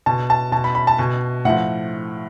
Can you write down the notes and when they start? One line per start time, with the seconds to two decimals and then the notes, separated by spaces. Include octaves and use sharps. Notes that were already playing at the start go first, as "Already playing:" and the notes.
0.06 B2 A5
0.30 A5
0.52 B2 A5
0.64 B5
0.75 B5
0.87 A5
0.98 B2 G#5
1.45 A2 F3 F#5